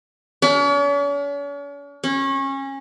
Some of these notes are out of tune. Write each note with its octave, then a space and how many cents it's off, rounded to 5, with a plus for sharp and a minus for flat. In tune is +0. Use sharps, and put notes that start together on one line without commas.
C#4 +45
C#4 -25